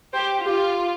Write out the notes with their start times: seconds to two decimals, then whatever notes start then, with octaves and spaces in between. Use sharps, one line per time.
0.13 G4 C5
0.44 F4 G4